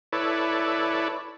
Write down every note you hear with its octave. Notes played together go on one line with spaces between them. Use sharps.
E4 A4 B4 C#5 D5